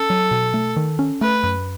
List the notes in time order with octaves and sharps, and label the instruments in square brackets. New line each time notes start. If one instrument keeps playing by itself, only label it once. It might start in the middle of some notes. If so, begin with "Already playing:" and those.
Already playing: [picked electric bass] C#4 [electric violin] A4
[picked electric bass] F#3
B2
A3
D#3
C#4
[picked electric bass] A3 [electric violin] B4
[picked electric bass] F#2